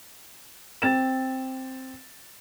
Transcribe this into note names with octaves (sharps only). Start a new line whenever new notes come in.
C4 A6 E7